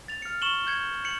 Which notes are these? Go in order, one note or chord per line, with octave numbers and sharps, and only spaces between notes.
A6 F7
F6 C#7
C#6 E7 F#7 G7
G6 G#6 C#7
G6 C#7 F#7